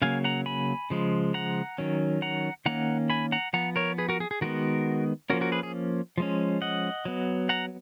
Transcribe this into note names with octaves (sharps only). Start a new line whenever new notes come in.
C#3 F#3 A#3 F5 G#5
F#5 A#5
G#5 B5
C#3 F3 G#3
F#5 A#5
D#3 F#3 C#4
F#5 A#5
D#3 A#3 C#4 F#5 A#5
G#5 B5
F#5 A#5
F3 B3 F#5 A#5
A#4 C#5
G#4 B4
F#4 A#4
G#4
G#4
D#3 G#3 B3 F#4 A#4
F3 A#3 C#4 F#4 A#4
F#4 A#4
G#4 B4
G#4
F3 G#3 C#4
D#5 F#5
F#3 B3
F#5 A#5